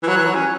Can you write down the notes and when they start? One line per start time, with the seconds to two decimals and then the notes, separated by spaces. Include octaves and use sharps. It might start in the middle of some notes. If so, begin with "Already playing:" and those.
0.03 E3
0.08 F#3 F#6
0.17 E3
0.26 F#3
0.35 C#4